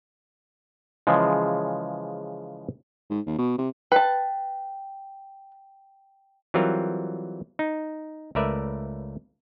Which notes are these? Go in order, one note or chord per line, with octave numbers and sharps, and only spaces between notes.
C#3 E3 F3 G#3
G#2
D#2
B2
C3
B4 G5 A5
E3 F#3 G3 C4 F4 A#4
D#4
C#2 A3 A#4 B4 D5 E5